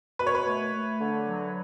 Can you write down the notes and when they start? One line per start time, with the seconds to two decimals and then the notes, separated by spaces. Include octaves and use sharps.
0.19 B2 B4
0.27 C#5
0.35 B4
0.46 A3
0.73 A3
0.99 D3
1.25 F#3